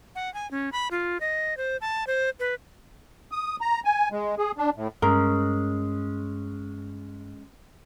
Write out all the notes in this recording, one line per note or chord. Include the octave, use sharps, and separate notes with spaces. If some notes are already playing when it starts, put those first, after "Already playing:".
F#5
G#5
C#4
B5
F4
D#5
C5
A5
C5
B4
D#6
A#5
G#5
G#3
G#4
D4
A2
G2 G#3 C#4 A#4